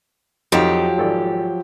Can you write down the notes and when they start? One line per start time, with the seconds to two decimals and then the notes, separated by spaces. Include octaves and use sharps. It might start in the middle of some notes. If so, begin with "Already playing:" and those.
0.52 F2 F3 F#3 D#4 G4
0.98 G#1 A4 D5